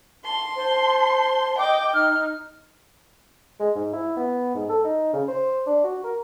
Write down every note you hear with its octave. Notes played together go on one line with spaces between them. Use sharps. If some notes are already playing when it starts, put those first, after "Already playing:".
A5 C6
C5
D#5 G5 D6
D#4 F6
G#3
G#2
E4
B3
G#2
A4
D#4
C#3
C5
D4
F#4
A#4